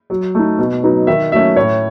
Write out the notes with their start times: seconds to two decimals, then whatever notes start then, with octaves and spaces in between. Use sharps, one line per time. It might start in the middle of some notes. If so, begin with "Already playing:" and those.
0.10 F#3
0.35 A3 D#4
0.59 B2
0.83 F#3 B3 D#4
1.07 D#3 E5
1.32 F#3 A3 C#4 E5
1.56 A2 C#5